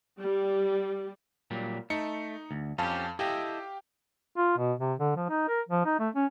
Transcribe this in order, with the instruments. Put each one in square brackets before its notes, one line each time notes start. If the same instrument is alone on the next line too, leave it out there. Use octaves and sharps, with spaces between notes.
[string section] G3
[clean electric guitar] A#2 F#3 G3
[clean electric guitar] A3 [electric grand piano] D#4 C#7
[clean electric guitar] D2
[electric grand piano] F2 F5 A5 [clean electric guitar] C#4 G4
[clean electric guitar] E4 A4 D#5 [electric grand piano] G4 F5 G5
[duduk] F4
B2
C3
D3
F3
D#4
A#4
F3
D#4
A3
C#4